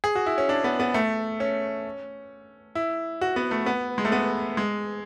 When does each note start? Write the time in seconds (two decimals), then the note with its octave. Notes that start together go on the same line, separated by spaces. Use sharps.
0.04 G#4
0.15 F#4
0.26 E4
0.38 C#4
0.49 D4
0.64 B3
0.80 B3
0.94 A3
1.40 C#4
2.75 E4
3.21 F#4
3.36 B3
3.51 A3
3.66 B3
3.98 G#3
4.05 A3
4.12 B3
4.57 G#3